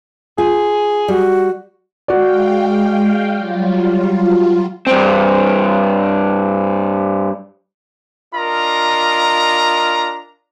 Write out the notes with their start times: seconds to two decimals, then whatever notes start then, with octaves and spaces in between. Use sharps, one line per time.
0.38 F4 G#4
1.08 G3 F#4
2.08 G#3 F#4 D5 F5 G5
3.34 F#3 G3 F4
4.87 G2 C4
8.34 D4 F4 A#4 D#5 A#5